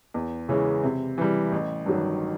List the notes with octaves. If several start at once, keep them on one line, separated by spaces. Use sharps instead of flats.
E2
C#3 E3 G#3 C#4
C3
E3 G3
A1
G2 D#3 F#3